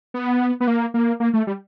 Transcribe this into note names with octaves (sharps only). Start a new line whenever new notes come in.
B3
B3
A#3
A#3
A#3
A3
G3